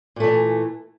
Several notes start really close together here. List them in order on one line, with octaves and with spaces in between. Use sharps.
A#2 A3 E3